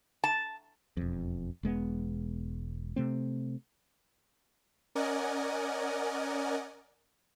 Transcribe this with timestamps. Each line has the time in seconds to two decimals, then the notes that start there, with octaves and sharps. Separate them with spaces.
0.24 A5
0.97 E1 F2
1.63 E1 G#3 A#3 B3
2.96 C3 A3 C4
4.95 C#4 A#4 D5 D#5 F#5 G#5